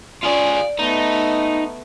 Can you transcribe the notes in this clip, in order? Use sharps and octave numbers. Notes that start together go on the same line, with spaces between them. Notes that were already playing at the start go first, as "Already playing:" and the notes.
F4 G#4 D5
A3 B3 D#4